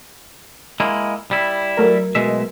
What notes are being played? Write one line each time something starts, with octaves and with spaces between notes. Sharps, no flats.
G#3 A#3 E4
G3 E4
F#3 A3 A#4
B2 G#3 E5